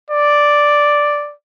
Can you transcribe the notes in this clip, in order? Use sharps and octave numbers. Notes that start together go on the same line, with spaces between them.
D5